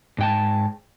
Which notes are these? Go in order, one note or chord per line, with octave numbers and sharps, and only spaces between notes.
G#2 G5 A5